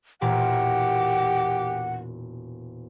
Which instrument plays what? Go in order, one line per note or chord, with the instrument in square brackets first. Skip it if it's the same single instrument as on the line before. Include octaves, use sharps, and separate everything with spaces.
[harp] E1 A#2 A#4 [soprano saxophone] G4 [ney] F#5